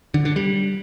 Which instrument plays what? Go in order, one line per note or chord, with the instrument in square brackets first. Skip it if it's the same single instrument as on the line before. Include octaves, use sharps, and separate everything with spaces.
[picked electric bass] D3
D3
G3